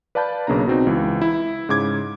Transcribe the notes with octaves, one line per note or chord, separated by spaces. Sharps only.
B4 D5 F5 A5 B5 G6
B1 C#3 A#3 D4 A#5
B2 C4 D#4
C#2 E3
E4
G#2 C#3 D6 G#6